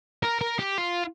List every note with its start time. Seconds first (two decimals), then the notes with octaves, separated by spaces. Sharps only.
0.23 A#4
0.41 A#4
0.59 G4
0.78 F4